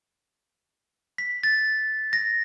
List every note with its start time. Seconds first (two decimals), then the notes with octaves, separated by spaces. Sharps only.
1.18 B6
1.44 A6
2.13 A#6